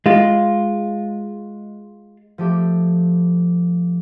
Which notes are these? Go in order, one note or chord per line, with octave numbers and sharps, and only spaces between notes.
G#3 F4
F3 A3 G4 E5